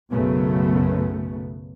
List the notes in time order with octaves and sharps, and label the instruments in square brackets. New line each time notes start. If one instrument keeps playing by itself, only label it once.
[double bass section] B1 F#2 C#3 A3 B3